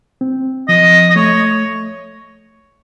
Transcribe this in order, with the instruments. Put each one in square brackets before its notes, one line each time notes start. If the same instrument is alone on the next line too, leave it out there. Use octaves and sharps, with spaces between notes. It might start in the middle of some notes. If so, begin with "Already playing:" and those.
[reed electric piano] C4
[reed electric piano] F3 [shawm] D#5
[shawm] D#5
[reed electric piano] A3 [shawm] C#5